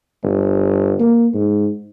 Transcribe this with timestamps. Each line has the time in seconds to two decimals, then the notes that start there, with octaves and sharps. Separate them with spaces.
0.23 G1
1.00 A#3
1.35 G#2